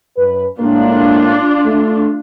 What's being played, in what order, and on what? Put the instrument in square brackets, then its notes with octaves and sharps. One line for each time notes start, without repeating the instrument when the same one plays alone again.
[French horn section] F#2 B4
[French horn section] A2 G#3 A#3 [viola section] D4 F4
[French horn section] A3